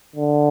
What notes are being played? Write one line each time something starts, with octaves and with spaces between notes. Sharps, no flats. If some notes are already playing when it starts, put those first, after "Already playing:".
D3